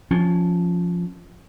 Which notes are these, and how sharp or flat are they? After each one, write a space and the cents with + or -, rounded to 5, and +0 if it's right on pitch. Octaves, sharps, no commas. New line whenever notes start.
F3 +0 C#4 +0